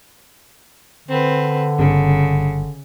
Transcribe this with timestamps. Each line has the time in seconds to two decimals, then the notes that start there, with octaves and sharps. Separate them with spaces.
1.09 D3 C4 B4
1.79 G1 C#3